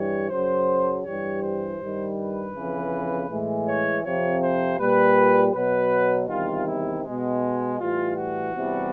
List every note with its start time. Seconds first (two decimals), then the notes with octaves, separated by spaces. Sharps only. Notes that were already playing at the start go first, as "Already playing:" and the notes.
Already playing: G2 E3 G3 C#5
0.30 F#2 C#3 F#3 C5
1.04 G2 E3 G3 C#5
1.42 C5
1.79 G2 D#3 G3
2.17 B4
2.54 F2 C#3 E3
3.30 A2 E3 G#3
3.66 C#5
4.03 F2 C3 F3 C#5
4.42 C5
4.79 A#2 G3 B4
5.53 B2 F#3 B4
6.28 E2 C3 D#3 G3 F4
6.66 E4
7.04 B2 G#3
7.77 A2 E3 G3 F4
8.15 F#4
8.53 E2 C3 E3 G3